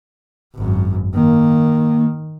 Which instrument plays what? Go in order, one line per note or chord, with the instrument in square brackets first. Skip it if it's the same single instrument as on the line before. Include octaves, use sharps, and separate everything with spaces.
[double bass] G#1 F#2
[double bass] D#3 [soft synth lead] A#3